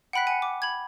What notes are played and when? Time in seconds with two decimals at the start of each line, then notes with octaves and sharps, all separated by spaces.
0.13 F#5 G5 B5 F#6 B6
0.27 F#5 G#5 C#7
0.42 D6
0.62 B5 G#6